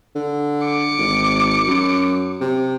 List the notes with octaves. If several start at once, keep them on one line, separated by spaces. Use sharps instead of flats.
D3
D6 C#7
G#1
F#2
C3